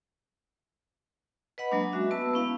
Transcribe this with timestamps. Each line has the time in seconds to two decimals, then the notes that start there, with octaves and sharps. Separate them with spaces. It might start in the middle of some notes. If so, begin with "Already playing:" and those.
1.58 B4 D#5 F#5 B5
1.71 F#3 G#3 A#3 D4 D6
1.92 G#3 C#4 F#4 E5
2.11 B3 B4 A5 E6
2.33 B3 C#4 E4 F5